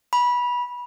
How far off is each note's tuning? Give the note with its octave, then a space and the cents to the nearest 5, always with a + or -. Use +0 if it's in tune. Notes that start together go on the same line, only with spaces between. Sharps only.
B5 -20